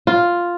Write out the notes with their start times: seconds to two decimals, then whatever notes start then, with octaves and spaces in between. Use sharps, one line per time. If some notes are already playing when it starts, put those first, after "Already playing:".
0.07 F4